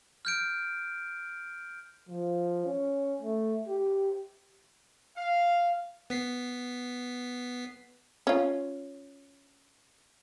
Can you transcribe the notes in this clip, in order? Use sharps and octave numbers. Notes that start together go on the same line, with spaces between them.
F6 G6 D7
F3
C#4
A3
G4
F5
B3 B6 C7
C#4 F4